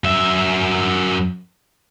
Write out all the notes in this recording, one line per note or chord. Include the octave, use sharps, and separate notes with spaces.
F#2 E5